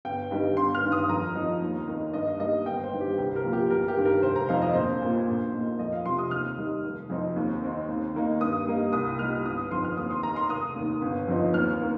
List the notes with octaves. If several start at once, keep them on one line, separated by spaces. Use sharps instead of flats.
G1 G5
G2 D#3 G3 D#4
G1 C6
F6
G2 D#3
D#6
F2 A#5
F3 D#4
D#2
D#3 A#3 D#4
G2 D#5
G3 A#3 D#4 D#5
G1 G5
C5
G2 D#3 G3
G4
C2 G4
A#4
A#2 F3 A#3
G4
G1 A#4
G4
G2 D#3
A#4
F1 C5
A#5
F2 D#3 C4 D#4 F5
D#5
A#1 C5
A#2 A#3
A#1
A#2 A#3 D#4
F2 D#5
F5
C3 F3 C6
D#6
D#2 F6
D#3 G3 D#4
F1
F2 F3 C4 D#4
D#2
D#3 C4 D#4
D#2
D#3 A#3 D#4
G2 D#6
G3 A#3 D#4
C2 D#6
A#2 G3 D#4 F6
G1 D#6
F2 D#3 C4 C6
F6
D#2 D#6
C6
D#3 A#3 D#4 A#5
C6
F1 D#6
D#2 D#3
G1
F2 F3 C4 D#4
D#2 F6
D#3 A#3